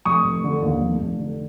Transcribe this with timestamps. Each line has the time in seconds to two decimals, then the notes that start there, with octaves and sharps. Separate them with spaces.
0.05 F1 C#6 D#6
0.25 F1
0.44 D3
0.62 D#2
0.81 F1
1.00 F1
1.20 D3